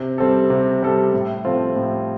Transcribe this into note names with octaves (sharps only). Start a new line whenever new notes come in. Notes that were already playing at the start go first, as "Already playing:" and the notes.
Already playing: C3
G3 C4 A4
C3
G3 C4 A4
A2
F3 C4 F4 A4
A2